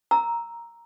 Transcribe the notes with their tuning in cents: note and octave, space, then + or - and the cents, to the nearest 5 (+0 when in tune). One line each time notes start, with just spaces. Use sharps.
A#5 +0 E6 +0